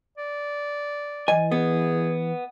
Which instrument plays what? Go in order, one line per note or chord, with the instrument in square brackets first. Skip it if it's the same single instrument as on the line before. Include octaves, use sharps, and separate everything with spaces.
[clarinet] D5
[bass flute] E3 [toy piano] D#5 [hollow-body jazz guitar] G#5
[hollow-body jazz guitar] B3 [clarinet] G#4